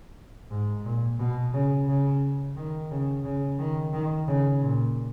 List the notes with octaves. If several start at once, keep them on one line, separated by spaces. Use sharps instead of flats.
G#2
A#2
B2
C#3
C#3
D#3
C#3
C#3
D#3
D#3
C#3
A#2